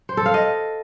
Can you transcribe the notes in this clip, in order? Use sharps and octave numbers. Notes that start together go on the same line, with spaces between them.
C5
A4
F5
D#5